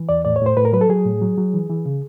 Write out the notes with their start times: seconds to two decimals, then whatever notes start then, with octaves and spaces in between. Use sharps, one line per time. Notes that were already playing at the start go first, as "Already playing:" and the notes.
Already playing: E3
0.09 E2 D5
0.25 A2 D5
0.36 C#5
0.42 A2 C5
0.57 A2 B4
0.65 A#4
0.73 F#3 B4
0.81 A4
0.89 F#3 G#4
1.05 A2
1.22 F#3
1.38 F#3
1.54 E3
1.69 E3
1.86 C#3